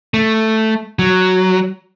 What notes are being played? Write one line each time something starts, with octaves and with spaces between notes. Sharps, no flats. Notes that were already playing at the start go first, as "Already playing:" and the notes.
A3
F#3